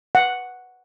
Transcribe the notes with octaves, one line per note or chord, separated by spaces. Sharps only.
F#5